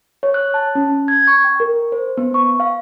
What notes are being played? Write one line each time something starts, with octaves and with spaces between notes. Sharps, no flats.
C#5
F#6
A5
C#4
G#6
C#6
G5
A#4
C5
B3
C#6
F5